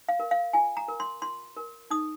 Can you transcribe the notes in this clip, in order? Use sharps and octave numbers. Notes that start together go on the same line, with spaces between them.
F5
A#4
F5
F4 G#5
A#5
A#4
C6
F4 C6
A#4
D#4 D#6